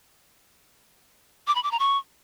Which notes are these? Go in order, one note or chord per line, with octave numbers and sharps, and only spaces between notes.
D6
B5
D6
A#5
C#6